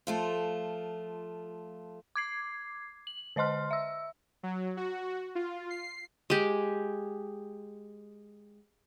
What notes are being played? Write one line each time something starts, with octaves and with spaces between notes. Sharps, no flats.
F3 A3 F4
D6 G#6 C7
F#7
D3 C5 D#5 C6 F6
E5 E6
F#3
F#4
F4
C7
G#3 G4